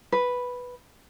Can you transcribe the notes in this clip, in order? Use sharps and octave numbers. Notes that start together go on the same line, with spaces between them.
B4